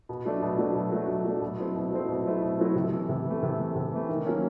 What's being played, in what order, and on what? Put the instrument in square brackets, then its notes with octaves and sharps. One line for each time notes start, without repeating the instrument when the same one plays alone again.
[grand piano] B2
F#3 A3 D4
B2
F#3 A3 D4
B2
F#3 A3 D4
B2
F#3 A3 D4
B2
F#3 A3 C4 E4
B2
F#3 A3 C4 E4
B2
F#3 A3 C4 E4
B2
F#3 A3 C4 E4
C3
E3 A3
C3
E3
A3
C3
E3 A3
C3
E3 A3
D#3
F#3 A#3 C#4